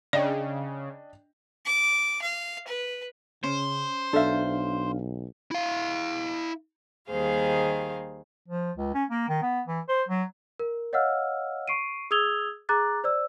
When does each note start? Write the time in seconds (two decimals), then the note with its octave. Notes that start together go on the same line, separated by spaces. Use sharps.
0.13 C#3 D4 D5 D#5 G5
1.65 D6
2.22 F5
2.67 B4
3.44 C#3 C#4 C5
4.13 B1 D4 A4 E5 F5
5.51 E4 F5
7.09 D#2 D#3 G3 G#4 C5 F5
8.48 F3
8.76 C#2
8.94 C#4
9.10 A#3
9.29 D#3
9.42 B3
9.67 E3
9.88 C5
10.08 F#3
10.59 A#4
10.93 C#5 D#5 F5 F#5 E6 F6
11.68 C#6 C7 D7 D#7
12.11 G#4 D#6 E6 G#6 F7 G7
12.69 G#4 A#5 D6 F#6 A6
13.04 C5 D5 E6